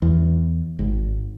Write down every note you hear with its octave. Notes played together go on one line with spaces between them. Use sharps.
E2
G#1